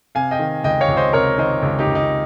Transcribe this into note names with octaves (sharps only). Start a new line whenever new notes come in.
C3 F5 G#5
D#5 G5
D#3
C#2 D#5 G5
C#5 F5
C#2
C5 D#5
C3 A#4 C#5
D#3 C5 D#5
C#2
D#4 G4
C#2
D#4